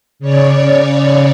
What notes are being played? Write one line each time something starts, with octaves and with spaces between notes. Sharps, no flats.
C#3 C#5 D5